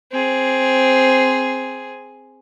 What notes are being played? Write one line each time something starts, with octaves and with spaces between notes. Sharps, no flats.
C4 G#4